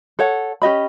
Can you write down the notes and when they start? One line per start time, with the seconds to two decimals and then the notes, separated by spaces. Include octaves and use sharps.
0.19 A4 C#5 F#5
0.62 C#4 G4 D#5 B5